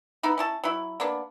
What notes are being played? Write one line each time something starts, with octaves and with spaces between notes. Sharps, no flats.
B3 D#4 E4
C#4 E4 A5
F#3 E4
A#3 B3 D4